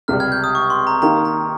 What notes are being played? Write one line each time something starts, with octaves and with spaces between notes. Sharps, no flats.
C#2 C3 G3 F6
F6 G#6
G6
D#6
C#6
C6
A#5
D#3 A#3 D#4 G4 A#5
A#5